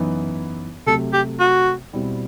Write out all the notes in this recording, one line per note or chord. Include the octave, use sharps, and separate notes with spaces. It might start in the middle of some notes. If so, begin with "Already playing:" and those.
Already playing: F#2 E3 B3 D#4
C3 F#3 A3 A4
G4
F#4
B2 G3 C4 E4